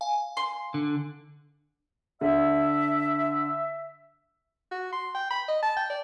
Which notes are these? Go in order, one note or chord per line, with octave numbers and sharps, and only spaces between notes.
F5 G#5
C6
D3
D3 E5
F#4
C6
G5
B5
D#5
A5
G5
D5